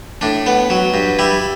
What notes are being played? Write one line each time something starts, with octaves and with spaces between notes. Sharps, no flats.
A2 D4
B3
F#3
G2
G3 E4